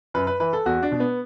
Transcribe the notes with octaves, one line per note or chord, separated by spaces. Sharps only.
F#2 B4
B4
E3 B4
A4
E2 F#4
D4
B2
B3